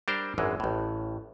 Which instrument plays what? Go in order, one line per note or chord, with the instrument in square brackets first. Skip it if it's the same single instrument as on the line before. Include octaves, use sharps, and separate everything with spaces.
[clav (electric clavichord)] G3 D4 A#4 C5 G5
G#1 F#2 E3 G#3
A1 A2